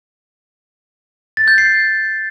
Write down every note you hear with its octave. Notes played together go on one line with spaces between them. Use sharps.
A6
G6
C7